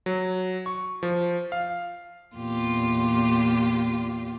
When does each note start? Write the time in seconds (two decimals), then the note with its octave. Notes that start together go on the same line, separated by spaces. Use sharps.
0.06 F#3
0.66 C#6
1.03 F3
1.52 F5
2.36 E2 A#2 F4 G4